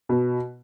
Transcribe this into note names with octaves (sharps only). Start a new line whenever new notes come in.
B2